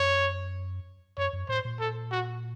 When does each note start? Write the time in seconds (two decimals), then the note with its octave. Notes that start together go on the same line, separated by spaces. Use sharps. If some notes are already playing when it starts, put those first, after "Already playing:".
Already playing: F#2 C#5
1.18 F#2 C#5
1.33 F#2
1.49 A2 C5
1.65 A#2
1.80 A4
2.12 F#4